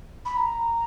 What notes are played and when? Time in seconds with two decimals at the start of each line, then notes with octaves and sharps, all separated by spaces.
0.25 B5
0.37 A#5